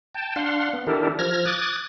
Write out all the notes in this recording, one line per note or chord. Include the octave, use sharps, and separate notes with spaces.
G5 A5
D4 F5 F#5 C6
B3
D#3 D4 E4 G4 A4 A#4
F3 F6 G#6 A#6
D6 D#6 F#6 G#6 A6